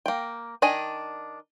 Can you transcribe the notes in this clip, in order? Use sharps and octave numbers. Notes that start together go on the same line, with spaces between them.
A#3 G5
D#3 D4 D#5 G#5